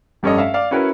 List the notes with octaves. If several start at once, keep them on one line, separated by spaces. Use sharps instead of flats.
F1 G2 C#4 A4 D#5
E5 F5
D5 F5
C#4 E4 F#4 A#4 B4